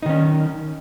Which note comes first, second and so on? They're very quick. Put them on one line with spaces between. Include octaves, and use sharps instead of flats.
D#4 D#3 C#4